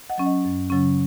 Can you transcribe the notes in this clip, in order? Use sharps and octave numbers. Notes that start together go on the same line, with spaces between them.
D#5 F#5
F#3 C#4
D#5 F#5
F#2
C#3 F#3 C#4